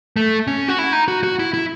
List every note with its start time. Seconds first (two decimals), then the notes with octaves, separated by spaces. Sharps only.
0.16 A3
0.47 C#4
0.68 F#4
0.79 E4
0.93 D#4
1.08 F#4
1.23 F#4
1.39 E4
1.54 E4